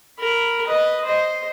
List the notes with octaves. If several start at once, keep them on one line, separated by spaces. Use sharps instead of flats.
A#4 B5
B4 D#5
C5 D#5